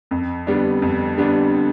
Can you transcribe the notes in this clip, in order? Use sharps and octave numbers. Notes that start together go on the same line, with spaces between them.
F2
D3 G3 B3 D4
F2
D3 G3 B3 D4